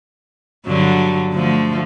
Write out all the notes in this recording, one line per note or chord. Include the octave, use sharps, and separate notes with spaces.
G2 D3 F#3
D3 F3 A3